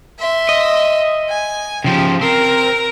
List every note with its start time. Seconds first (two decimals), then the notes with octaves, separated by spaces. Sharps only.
0.19 E5 C6
0.49 D#5
1.29 G#5
1.84 C#3 F3 G4
2.21 C4 A#4